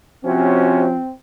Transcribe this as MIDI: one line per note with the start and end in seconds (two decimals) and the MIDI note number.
0.25 0.87 48
0.25 0.97 53
0.25 1.11 60
0.25 0.87 61
0.25 0.86 66